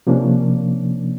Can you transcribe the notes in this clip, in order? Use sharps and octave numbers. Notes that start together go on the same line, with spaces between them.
C3 F3 A#3 C#4 D4